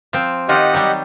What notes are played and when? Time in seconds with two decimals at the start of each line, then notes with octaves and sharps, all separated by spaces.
0.13 F3 C4
0.49 D#3 D#4 F4 G4 D#5 F#5
0.74 F#3 G3